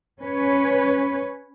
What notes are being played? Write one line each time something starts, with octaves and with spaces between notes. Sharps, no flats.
C#4 B4 C#5